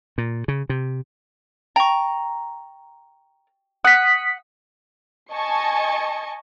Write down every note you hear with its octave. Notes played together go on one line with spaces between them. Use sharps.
A#2
C#3
C3
G5 A#5 C#6
F#5 D#6 B6
D#5 G#5 A5 C#6 C#7